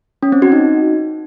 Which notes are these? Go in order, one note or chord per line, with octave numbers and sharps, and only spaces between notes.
C#4
C4
F#4
D#4